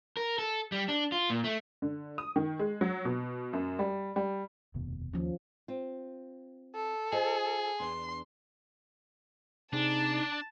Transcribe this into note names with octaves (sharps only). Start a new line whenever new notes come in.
A#4
A4
G3
D4
F4
A#2
A3
D3
D#6
D#3
G#3
F#3
B2
F#2
G3
G3
F1 D#2 B2
D#2 F3 C#4
C4 F4
A4
F4 G#4 C5 D#5
E2 D4 C6
C3 C4 D4 D#4 G#4 A5